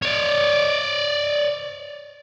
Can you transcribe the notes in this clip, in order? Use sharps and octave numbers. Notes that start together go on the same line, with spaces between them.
C#5 D5